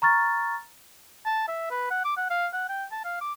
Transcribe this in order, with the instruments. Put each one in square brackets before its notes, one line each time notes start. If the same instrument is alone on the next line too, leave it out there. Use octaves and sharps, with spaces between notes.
[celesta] A#5 C#6 F6 A6
[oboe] A5
E5
B4
F#5
D6
F#5
F5
F#5
G5
A5
F5
D6